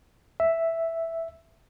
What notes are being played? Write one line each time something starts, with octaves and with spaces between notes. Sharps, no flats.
E5